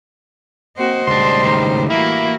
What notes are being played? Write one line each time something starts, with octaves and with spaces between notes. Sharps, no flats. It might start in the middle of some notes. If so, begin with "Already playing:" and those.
A#3 C4 F#4 C5 D#5
C#2 A2 G3 D4 C6
C#2 D#3
E3 A#3 E4 F#4